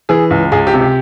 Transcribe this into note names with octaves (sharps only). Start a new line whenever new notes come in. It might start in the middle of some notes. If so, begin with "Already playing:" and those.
E3 G#4
C#2
C#2 G#4
G4
C3
G4